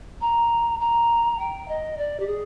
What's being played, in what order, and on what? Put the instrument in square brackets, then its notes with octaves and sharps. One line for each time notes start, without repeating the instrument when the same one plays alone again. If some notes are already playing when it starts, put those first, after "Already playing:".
[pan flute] A#5
A#5
G5
D#5
D5
G4
G#4